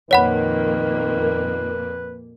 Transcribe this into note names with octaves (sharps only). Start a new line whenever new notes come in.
F2 A#2 D#3 A#3 B4 C#5 F#5 B5